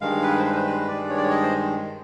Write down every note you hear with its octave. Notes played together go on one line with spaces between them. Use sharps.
G2 D#3 G#3 F5
B4
C5
B4
C5
B4
G2 D#3 G#3 D5
C#5
D5
C#5
D#5
C5